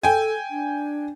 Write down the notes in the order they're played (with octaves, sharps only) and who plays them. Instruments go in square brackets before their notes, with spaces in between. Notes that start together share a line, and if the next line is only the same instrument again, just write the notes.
[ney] A4 [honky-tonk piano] G5 G#5
[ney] D4